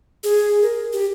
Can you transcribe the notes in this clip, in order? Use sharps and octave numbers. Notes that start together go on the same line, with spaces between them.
G#4
A#4
G4